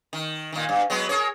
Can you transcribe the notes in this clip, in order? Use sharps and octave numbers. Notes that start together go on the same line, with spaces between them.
D#3
A#2 D#3
G2
F#3 G#3 B3
G#4 A#4 C#5